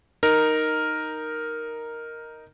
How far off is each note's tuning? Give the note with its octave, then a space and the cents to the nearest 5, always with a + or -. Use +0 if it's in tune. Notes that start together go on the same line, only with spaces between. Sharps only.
D#4 +0 A#4 +0